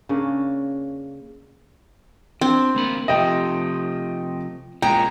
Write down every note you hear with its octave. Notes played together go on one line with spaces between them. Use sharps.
C#3 A#3 C#4 D4
C4 D4
D2 A#3 B5
C3 F3 A3 D#5 G5
A#2 G#3 C#4 G5 A#5